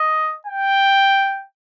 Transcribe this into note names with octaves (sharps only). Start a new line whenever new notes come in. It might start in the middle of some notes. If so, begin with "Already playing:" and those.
Already playing: D#5
G5